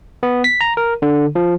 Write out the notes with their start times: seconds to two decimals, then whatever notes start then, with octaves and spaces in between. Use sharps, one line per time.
0.23 B3
0.44 B6
0.61 A#5
0.77 A#4
1.02 D3
1.35 F3